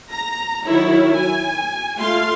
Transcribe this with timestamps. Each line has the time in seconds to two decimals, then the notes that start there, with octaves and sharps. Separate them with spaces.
0.11 A#5
0.65 D#3 F#3 E4 C#5
1.14 G#5
1.97 A3 F4 F5 C6